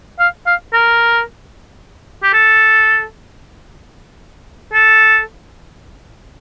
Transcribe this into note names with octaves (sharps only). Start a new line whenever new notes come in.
F5
F5
A#4
G4
A4
A4